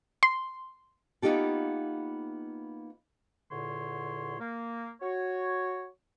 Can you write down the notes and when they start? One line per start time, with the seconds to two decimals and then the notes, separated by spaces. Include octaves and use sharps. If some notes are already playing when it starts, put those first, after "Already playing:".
0.23 C6
1.22 A#3 B3 D#4 F4 G4 A4
3.50 E2 A#2 D3 C#5 C6
4.39 A#3
5.01 F#4 C#5